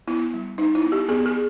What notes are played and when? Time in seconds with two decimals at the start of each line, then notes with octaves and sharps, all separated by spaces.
0.07 B3 E4
0.34 G3
0.58 G3 D#4
0.75 E4
0.83 B3
0.92 G4
1.09 B3 G#4
1.26 G#4